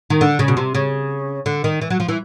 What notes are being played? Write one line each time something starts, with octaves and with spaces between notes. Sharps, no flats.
D#3
D3
C#3
B2
C3
C#3
D3
D#3
E3
F#3
F3
E3